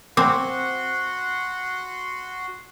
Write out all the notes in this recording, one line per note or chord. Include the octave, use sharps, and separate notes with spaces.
C4 F#4 F#5 G#5 C6 D6